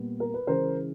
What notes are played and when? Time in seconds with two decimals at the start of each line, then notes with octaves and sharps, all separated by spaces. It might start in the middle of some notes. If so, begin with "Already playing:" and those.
Already playing: A#2 G3 B3
0.20 A#4
0.34 B4
0.47 C#3 E3 G#3 A#4 C5